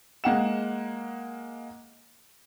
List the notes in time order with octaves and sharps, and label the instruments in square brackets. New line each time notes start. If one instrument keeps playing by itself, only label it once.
[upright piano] G#3 A#3 F#5 E7